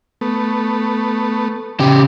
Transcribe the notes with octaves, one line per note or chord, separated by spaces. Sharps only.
A3 B3
C#3 G4